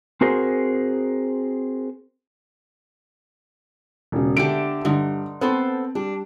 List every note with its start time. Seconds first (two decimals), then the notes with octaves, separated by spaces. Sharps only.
0.21 C4 F#4 G#4 A#4 C5
4.12 E1 C#3
4.37 D3 A3 G4 D7
4.85 G2 D3 D#4
5.41 B3 C4 A4 C5
5.95 G3 D4